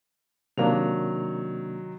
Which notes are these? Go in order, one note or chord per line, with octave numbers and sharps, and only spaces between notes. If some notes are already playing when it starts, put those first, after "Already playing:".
C3 D#3 F#3 A#3 D4 F7